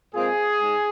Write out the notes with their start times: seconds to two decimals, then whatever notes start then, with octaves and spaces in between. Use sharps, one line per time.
0.14 A#2 G#3 C4 F4 G#4
0.60 G#2 G#3